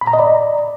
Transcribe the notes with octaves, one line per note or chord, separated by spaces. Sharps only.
B5
A#5
D#5
D5